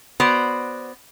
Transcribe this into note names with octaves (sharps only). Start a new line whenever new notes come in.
B3 F#4 C5 D5